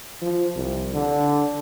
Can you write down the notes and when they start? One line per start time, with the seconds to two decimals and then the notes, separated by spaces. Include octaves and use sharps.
0.22 F3
0.56 C2
0.94 D3